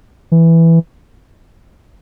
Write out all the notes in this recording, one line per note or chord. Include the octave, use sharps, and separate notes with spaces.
E3